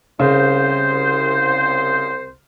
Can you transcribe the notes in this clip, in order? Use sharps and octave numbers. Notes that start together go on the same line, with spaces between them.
C2 C#3 C5